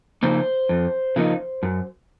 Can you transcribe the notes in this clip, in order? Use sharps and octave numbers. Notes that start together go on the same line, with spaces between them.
C#3 F3 A#3 D#4 C5
F2
C#3 F3 A#3 D#4
F#2